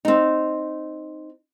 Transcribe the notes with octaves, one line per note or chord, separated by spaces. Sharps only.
C4 D#4